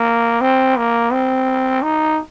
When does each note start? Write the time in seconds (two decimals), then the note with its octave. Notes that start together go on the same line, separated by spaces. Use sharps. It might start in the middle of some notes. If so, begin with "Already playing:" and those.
Already playing: A#3
0.41 C4
0.77 A#3
1.12 C4
1.83 D#4